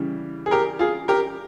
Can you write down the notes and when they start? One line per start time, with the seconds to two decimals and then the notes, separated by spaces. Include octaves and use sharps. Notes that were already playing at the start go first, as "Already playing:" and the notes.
Already playing: C#3 E3 G3
0.46 G#4
0.51 G4 A#4
0.79 F4 G#4
1.08 G4 A#4